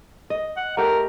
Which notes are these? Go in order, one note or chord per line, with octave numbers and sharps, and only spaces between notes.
D#5
F#5
A3 G4 A#4